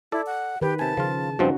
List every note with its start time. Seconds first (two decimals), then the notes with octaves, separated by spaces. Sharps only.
0.12 E4 A4 D5
0.26 F#5
0.61 D#3 G4 B4
0.79 C3 G#5 A5
0.97 C#3 F3 F4
1.39 G2 F3 C4 C#4 D#4 F#4